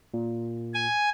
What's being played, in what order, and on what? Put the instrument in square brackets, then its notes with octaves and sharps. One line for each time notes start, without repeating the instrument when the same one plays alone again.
[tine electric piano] A#2
[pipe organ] G#5